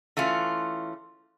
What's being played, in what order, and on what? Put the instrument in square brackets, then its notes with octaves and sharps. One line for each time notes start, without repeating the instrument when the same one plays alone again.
[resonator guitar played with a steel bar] E3 A3 C#4 F4